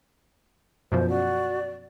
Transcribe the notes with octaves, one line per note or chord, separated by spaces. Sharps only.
F#2 B2 F3 C5
F#4 D5